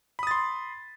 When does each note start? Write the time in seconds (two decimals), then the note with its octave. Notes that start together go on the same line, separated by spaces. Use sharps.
0.19 B5
0.23 D#6
0.27 A6
0.31 C6